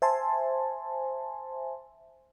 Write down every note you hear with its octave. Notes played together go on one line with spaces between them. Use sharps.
C5 E5 G#5 A5 C6